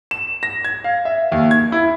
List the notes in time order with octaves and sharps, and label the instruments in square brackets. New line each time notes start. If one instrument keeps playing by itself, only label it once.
[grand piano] E7
A#6
G#6
F5
E5
D#2
G#6
E4